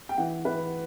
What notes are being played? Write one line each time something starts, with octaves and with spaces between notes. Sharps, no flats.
G5
E3 F#5
E3 B4